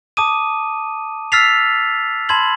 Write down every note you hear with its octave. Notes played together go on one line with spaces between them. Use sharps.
A5 D6 D#6 D#7
E6 F6 A6 B6 C7 F7
A5 B5 C6 G#6 F#7